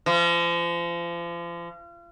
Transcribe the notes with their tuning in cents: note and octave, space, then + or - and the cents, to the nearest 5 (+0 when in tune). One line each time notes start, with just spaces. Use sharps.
F3 -35